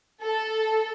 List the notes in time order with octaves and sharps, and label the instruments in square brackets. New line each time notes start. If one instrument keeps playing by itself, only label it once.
[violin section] A4